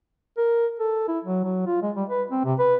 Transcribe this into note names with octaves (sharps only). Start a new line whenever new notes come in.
A#4
A4
E4
F#3
F#3
F4
G#3
G3
B4
C4
C3
B4